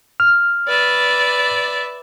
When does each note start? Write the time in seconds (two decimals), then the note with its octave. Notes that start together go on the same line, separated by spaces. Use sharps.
0.20 F6
0.68 B4 D5 E5